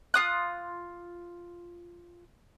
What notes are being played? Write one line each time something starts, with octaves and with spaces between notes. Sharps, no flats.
F4 D#6 F#6